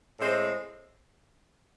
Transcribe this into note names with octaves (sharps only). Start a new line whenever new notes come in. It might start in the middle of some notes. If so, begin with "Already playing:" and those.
A2 G#3 C4 C5